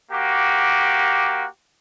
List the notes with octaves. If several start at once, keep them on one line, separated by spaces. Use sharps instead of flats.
A#3 F#4 G4